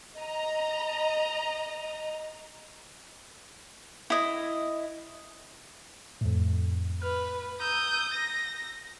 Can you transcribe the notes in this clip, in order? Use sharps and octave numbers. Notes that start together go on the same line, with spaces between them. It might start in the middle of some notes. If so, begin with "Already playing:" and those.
D#5 A#5
E4 D#5
F2 A2
B4 F6
A#5 D#6 E6 G6
A#6